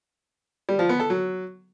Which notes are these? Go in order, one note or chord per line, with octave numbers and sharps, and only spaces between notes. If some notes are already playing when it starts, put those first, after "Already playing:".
G3
F3
B3
A4
F#3